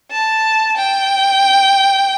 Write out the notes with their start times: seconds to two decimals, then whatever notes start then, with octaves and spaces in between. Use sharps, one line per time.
0.11 A5
0.77 G5